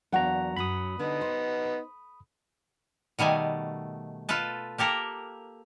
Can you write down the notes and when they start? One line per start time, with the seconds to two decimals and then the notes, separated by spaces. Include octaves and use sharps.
0.12 E2 F#3 A#3 D4 F#4 F#5 A#5
0.56 F#2 F#3 B5 D#6
0.99 D3 B3 D#4
1.21 C5
3.19 B2 D#3 G3 A3 G#5
4.29 F4 A4 B4 A5
4.78 A#3 G4 A4 A#4